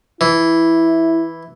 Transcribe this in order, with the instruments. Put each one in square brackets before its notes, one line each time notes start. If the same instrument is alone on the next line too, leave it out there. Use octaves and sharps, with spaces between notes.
[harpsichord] E3 [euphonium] E4